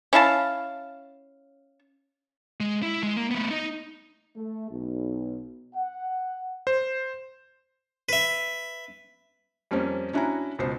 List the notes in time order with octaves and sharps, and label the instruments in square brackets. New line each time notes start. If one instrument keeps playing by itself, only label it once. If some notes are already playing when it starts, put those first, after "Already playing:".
[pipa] C#4 E4 F5 A5
[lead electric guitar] G#3
E4
G#3
A#3
A3 B3
D#4 D#5
[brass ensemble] A3
B1
F#5
[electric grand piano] C5
[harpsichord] B4 E5
[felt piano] F2 G3 A#3 C4 C#4
C#4 D4 E4 F#4 G#5 A#5
C#2 B2 C5 C7